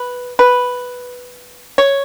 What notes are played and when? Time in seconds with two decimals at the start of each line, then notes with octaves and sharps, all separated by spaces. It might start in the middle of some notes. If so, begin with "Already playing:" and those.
Already playing: B4
0.39 B4
1.78 C#5